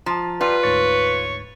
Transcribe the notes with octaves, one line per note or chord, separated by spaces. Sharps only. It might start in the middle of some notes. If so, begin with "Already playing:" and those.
F3 A5 A#5
G3 F4 B4
D2 G#2 C#5 A6